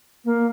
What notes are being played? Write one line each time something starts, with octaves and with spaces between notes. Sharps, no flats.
A#3